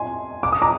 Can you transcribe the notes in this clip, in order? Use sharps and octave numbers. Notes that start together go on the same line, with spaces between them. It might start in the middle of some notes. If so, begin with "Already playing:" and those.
Already playing: G#5 C6
D6
D#6
A#5 D6